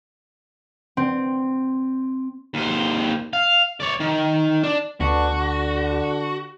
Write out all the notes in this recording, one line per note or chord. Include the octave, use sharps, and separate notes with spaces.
C4
D#2 C5
F5
C#5 D5
D#3
D4
D2 D3 B3 D4 F#4
D3